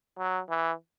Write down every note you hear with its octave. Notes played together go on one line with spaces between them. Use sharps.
F#3
E3